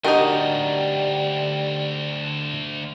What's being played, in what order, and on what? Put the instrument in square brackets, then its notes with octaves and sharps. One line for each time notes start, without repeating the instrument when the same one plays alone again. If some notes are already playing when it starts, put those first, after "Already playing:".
[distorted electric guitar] D2 D#5 [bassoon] G3 [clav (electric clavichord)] D4 F#4 G4 [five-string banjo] D#4 A#4